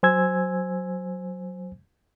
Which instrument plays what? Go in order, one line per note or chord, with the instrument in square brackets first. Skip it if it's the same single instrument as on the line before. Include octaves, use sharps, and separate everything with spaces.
[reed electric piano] F#3 C5 G#5 E6 G#6